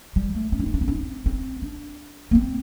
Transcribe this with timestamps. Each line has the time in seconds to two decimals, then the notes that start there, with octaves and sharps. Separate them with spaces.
0.16 G3
0.35 A3
0.52 C4
0.60 D4
0.66 C4
0.74 D4
0.81 C4
0.88 D4
0.95 C4
1.26 C4
1.62 D4
2.31 A#3
2.35 C4